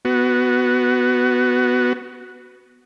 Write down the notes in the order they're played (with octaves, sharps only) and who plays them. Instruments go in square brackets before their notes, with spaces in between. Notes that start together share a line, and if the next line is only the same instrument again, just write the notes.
[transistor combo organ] B3 F#4